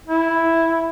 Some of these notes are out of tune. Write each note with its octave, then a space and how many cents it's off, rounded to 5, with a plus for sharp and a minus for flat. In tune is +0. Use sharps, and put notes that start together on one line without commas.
E4 +0